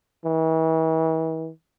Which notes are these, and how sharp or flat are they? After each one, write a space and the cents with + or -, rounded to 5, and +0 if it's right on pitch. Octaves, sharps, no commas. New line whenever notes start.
E3 -40